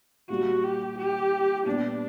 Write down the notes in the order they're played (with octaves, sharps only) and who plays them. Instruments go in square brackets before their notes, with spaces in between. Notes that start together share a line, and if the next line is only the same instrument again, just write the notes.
[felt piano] A#2 G3 A#3 [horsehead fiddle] F#4
[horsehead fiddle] G4
G4
[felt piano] A#2 G3 B3 [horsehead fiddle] D4